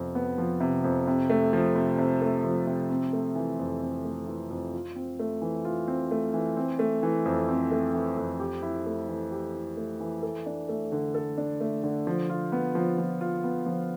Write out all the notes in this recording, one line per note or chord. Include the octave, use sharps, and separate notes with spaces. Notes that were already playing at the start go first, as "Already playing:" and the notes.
Already playing: F2 C3 F3 B3
B3
F3
C3
F2
C3
A3
F3
C3
C3
A3
F3
C3
C4
A3
E3
F2
C4
A3
E3
F2
F4
C4
A3
E3
F4
C4
A3
E3
C4
A3
E3
F2
C4
A3
E3
F2
G4
E4
A3
E3
G4
E4
A3
E3
A4
D4
A3
D3
A4
D4
A3
D3
F3
F4
B3
F3
F3
F4
B3
F3